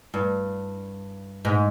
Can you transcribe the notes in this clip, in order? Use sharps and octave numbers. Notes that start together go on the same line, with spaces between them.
G2
G#2